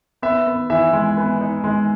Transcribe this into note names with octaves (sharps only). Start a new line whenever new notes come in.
B3 E5
B3
E3 E5
G#3
B3
D#4
G#3